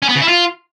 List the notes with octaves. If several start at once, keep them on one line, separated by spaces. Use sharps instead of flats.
C#4
B3
C#3
E4
F4